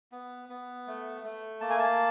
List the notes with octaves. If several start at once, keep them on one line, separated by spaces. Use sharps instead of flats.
B3
B3
A3
A3
A#3 A5
G#5
A5